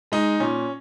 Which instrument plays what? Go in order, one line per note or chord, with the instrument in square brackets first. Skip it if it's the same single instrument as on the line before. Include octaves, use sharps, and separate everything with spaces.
[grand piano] G#3 D#4
A#2 C#4